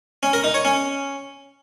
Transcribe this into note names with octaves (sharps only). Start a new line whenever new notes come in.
C#4
A#4
D#4
C#5
C#4